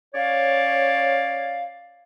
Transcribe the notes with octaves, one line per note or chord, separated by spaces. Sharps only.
C#4 C#5 D5 F5